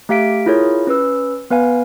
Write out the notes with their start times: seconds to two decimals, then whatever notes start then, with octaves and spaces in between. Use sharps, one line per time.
0.09 A3 G4 F5 B6 D7
0.46 E4 F4 G#4 A#4 C#5
0.87 C#4 B4 E6
1.50 B3 B4 F5 G#5